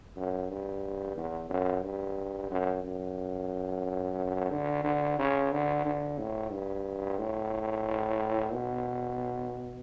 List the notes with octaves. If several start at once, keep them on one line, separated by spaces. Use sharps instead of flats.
F#2
G2
E2
F#2
G2
F#2
F#2
D3
D3
C#3
D3
D3
A2
G2
A2
B2